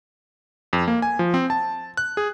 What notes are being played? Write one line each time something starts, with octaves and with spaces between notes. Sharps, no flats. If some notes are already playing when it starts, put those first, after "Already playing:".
F2
A#3
G#5
F3
C4
A5
F#6
G#4